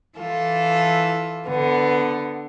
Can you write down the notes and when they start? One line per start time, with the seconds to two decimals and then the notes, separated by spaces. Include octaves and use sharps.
0.18 E3 F4 A4
1.47 D3 B3